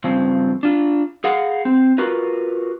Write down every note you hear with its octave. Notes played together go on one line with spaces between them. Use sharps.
G2 C#3 F3 C4
D4 F4
G#4 F5 F#5
C4
F4 F#4 A#4 B4